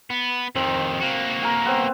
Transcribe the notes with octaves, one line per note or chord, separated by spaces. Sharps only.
B3
F2 D#3 C4
A#3 F#4
A#4 G#5
B3 C4